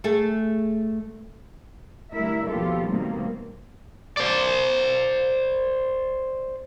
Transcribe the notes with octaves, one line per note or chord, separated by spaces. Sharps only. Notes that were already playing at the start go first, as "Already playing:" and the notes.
A3 G#4 A4
D3 G3 A3 E4 A#4 E5
D#2 B2 F3 F4 G4 A4
B2 D#3 G3 A3 A#3 C4
C5 D5